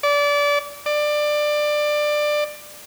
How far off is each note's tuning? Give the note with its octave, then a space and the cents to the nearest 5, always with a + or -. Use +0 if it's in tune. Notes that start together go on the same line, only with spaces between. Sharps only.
D5 -25
D5 +20